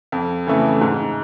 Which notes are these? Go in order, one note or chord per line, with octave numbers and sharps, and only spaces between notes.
F2
C#3 E3 A3
G#2